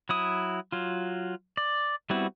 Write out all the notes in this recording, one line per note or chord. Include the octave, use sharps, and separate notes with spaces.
F#3 E4 D#6
F#3 F4
D5
G3 B3 C4 E4 F#4